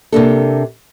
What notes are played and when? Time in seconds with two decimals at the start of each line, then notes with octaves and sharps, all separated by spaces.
0.12 C3 A#3 D4 A4